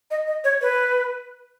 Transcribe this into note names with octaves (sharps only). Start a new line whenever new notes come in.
D#5
D#5
C#5
B4